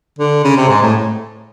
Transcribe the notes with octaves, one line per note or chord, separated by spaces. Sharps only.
D3
C#3
C3
G#2
A2